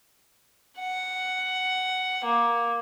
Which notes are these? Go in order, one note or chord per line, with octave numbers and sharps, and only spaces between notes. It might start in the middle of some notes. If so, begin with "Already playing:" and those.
F#5
A#3